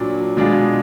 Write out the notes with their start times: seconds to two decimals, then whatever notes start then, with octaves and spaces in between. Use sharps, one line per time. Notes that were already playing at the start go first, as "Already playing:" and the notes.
Already playing: A#2 F#3 D4
0.37 B2 G#3 D4 F4 G#4